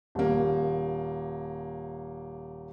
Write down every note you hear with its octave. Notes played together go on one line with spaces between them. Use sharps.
D#1 A#3